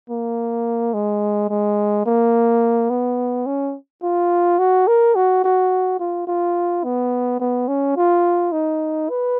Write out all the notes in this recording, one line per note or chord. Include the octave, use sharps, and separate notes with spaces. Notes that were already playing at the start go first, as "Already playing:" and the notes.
A#3
G#3
G#3
A#3
B3
C#4
F4
F#4
A#4
F#4
F#4
F4
F4
B3
B3
C#4
F4
D#4
B4